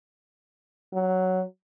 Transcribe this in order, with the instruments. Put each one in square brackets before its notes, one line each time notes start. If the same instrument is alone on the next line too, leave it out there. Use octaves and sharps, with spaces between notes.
[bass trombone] F#3